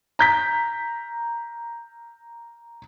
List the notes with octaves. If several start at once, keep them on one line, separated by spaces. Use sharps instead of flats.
A#5 G6 B6